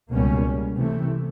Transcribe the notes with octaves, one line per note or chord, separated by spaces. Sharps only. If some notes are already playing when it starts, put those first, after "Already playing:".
C#2 B2 G3 A#3 C#4
C3 E3 A3